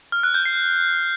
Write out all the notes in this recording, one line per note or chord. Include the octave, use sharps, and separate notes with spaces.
F6
F#6
G6
C7